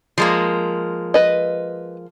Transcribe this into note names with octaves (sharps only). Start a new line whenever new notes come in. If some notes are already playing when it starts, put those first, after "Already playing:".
F3 G#3 A#3
B4 D#5